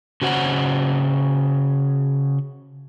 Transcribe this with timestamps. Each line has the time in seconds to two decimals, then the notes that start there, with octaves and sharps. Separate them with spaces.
0.22 C#3 F#4 C5 F#5